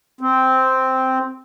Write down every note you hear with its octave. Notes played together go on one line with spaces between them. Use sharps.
C4